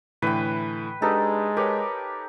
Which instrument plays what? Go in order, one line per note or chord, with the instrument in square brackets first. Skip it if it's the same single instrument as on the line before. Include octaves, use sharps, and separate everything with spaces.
[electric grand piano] A2 D3 E3 [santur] B4 G5
[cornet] G#3 [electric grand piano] D4 G4 B4 [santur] D#4 A4
[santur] G4 [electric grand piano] A#4 B4 C#5